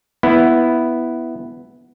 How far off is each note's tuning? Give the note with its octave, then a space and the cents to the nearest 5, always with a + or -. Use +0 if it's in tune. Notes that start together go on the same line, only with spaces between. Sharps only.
B3 +0 E4 +0